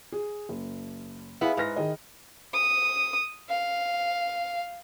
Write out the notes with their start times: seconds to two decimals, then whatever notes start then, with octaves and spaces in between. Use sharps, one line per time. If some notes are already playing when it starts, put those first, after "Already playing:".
0.12 G#4
0.49 F#1
1.41 B3 E4 G#4 F5 G#5
1.57 G#2 B4 F6 A#6
1.76 D#3 G#4 D#5
2.54 D#6
3.49 F5